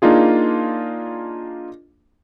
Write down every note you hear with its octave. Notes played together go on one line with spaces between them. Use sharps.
A#3 D4 D#4 F4 G#4